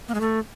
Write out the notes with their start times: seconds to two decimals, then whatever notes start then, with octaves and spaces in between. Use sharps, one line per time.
0.08 A#3
0.14 G#3
0.21 A3